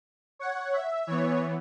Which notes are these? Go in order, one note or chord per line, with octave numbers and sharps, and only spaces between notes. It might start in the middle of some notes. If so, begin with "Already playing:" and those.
C#5 F#5
E5
E3 B3 C#5